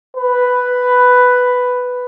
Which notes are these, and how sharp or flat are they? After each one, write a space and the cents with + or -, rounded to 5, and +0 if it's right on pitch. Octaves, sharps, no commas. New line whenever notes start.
B4 +5